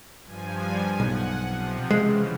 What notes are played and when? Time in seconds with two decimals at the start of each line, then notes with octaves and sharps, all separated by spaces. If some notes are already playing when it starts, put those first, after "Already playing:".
0.24 G2 F3 G#5
1.00 B1 F#5
1.45 C3 F3
1.91 F2 C#3 E3 G#3